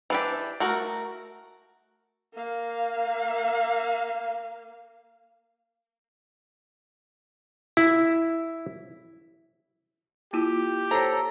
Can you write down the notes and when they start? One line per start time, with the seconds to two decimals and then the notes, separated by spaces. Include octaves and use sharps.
0.10 E3 D4 G4
0.60 A3 F#4 A#4
2.34 A#3 F5
7.77 E4
10.33 A#3 E4 F4 G4
10.91 A4 C5 C#5 A#5